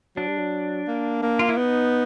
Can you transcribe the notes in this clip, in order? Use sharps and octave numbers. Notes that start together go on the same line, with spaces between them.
F#3 D4
G3
F#3
A#3
A#3
F4
E4
B3 D#4